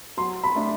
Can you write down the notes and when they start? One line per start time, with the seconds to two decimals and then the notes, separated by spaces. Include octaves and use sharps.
0.17 F#3 C6
0.44 B5
0.56 A3 D4